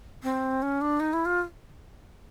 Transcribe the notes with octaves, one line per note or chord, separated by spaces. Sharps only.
C4
C#4
D4
D#4
E4
F4